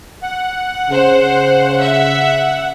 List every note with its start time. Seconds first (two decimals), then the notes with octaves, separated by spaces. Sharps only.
0.23 F#5
0.90 C#3 C5
1.81 E5